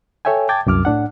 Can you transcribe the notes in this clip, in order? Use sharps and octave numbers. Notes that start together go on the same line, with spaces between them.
A4 C#5 E5 G5 G#5
G5 A5 D6 G#6 A6
C2 F#2 D6 F6
A2 D4 F#5